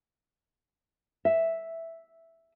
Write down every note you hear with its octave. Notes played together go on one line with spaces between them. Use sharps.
E5